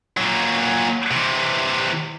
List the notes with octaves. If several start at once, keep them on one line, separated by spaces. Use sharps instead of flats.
A#2 F#3
C3 E3